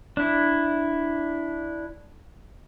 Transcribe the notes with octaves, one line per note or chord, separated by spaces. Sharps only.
D4 E4